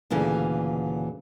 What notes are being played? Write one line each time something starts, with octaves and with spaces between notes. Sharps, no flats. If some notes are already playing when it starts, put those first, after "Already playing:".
D2 A#2 C#3 E3 A3